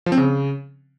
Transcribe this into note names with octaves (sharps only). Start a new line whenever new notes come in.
F3
C4
C#3